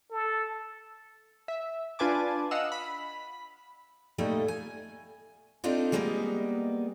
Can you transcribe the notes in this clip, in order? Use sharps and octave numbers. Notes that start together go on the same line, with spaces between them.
A4
E5
D4 F4 B4 G#5 A5 D6
D#5 F5 F#5 E6
B5
A#2 G3 A3 A#3 D#4 A4
G#5
C4 D4 D#4 F4 A4 C5
G3 G#3 A#3 B3 D#5